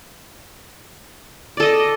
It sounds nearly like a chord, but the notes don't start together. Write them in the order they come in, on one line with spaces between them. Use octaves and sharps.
D5 A4 D#5